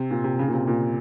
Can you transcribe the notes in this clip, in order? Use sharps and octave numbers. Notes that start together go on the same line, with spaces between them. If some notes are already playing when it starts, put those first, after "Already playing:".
Already playing: C3
A#2
C3
C#3
A#2
C3
A#2